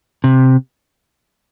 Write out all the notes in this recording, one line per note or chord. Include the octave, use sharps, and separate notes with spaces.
C3